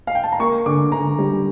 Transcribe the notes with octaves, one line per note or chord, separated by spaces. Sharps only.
F5
G5
A5
A#5
A#3 C#6
D3 D6
D3 A#5
G3